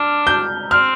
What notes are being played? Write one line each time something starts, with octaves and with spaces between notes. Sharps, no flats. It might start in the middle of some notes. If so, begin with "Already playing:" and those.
Already playing: D4 F6
G6
C4 F6